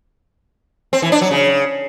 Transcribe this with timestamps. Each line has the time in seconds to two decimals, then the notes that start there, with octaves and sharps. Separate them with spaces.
0.93 C4
1.02 E3
1.12 D4
1.22 F#3
1.31 C#3